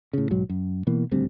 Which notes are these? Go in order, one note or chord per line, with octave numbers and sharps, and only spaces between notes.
A2 C#3
B1 G#2 F#3
F#2
B2 E3 A#3
D#1 D2 G3 C4